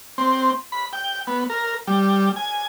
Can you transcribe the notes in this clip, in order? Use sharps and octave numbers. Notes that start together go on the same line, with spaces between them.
C4
B5
G5
B3
A#4
G3
G#5